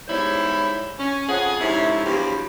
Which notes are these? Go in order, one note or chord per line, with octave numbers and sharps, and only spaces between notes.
E2 G#2 G3 E4 C5 C#5
C#4
F2 G#4 F#5
F2 G#2 C3 C#4 E4
E2 G2 F3 F#3 G4